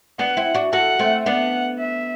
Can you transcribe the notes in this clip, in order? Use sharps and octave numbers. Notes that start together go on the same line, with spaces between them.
B3 D4 F#5
C4 E4
D4 F#4
F#4 A4 F#5
A3 C4
B3 D4 F#5
E5